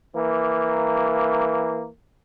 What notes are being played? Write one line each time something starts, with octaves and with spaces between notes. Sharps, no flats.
E3 A#3